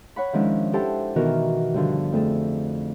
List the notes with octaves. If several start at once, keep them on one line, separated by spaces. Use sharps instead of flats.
C#5 F#5 B5
D#3 F3 G#3 C#4 D4 E4
E4 G4 A4 C5 F#5 A5
B2 D#3 E3 F#4 A#4 F6
G2 D3 F3
F2 A3 G#4 A4